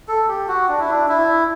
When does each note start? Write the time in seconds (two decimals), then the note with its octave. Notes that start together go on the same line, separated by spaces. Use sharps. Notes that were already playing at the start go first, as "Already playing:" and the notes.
0.08 A4
0.28 G4
0.48 F#4
0.69 D4
0.79 E4
0.90 D4
1.09 E4